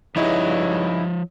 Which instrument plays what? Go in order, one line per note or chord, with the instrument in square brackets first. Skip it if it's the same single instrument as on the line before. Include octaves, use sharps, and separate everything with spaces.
[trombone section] G2 C#3 [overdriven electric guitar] F3 C#5 [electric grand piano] D#4 E4 D#5